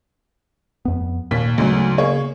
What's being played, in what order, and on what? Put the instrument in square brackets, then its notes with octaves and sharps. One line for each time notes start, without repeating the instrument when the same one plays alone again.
[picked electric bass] F2 B3
[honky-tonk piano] D#2 B6 [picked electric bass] A#2 A#3
[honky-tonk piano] D2 G#2 F#3 [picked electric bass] C#3 B3
[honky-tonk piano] A#3 G#4 C#5